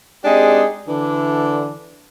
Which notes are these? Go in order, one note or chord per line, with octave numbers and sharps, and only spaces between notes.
G#3 C4 D4 D#4 G4 G#4
D3 E3 D4